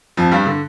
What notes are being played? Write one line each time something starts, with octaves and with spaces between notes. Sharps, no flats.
F2 F3
G2 G3
D3